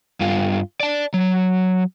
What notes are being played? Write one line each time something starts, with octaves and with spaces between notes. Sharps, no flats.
G2 F4
D5 A5
F#3